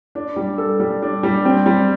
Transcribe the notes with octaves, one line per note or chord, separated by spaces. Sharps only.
D4
G3
A4
G3
D4
G3
C4
G3